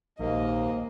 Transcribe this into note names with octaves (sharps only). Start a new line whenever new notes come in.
A#1 D#2 G#2 A#3 D#5